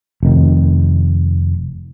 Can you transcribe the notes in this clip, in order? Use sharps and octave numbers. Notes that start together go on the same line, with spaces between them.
F1 D#3